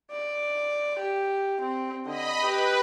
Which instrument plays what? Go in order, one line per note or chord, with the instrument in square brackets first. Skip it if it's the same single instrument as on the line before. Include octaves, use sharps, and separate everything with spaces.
[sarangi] D5
G4
C4
[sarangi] D3 [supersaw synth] D#5 B5
[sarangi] G4 [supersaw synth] B4